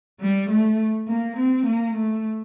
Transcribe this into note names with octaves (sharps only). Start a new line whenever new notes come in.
G3
A3
A#3
C4
A#3
A3